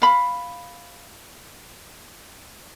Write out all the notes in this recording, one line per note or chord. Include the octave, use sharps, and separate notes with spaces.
F5 B5